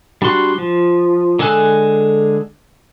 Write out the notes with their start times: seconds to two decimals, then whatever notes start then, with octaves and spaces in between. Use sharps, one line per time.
0.22 G3 D4 F#4 C6 F#6
0.58 F3
1.39 D3 G#3 A4 G#5 F#6